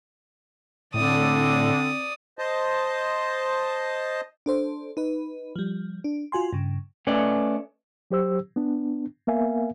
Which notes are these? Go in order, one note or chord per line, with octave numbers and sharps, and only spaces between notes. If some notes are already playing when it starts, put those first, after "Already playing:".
A2 D3 C4 D5 D#6
C5 D#5 A5
D4 A4 C5
D#4 B4
F3 G3
D4
F4 F#4 G#5 C6
G2 C#3
A3 C#4 B4 D5 D#5
F#3 G4 C5 E6
B3 D4
A#3 B3 A#4 E5 F5 G#5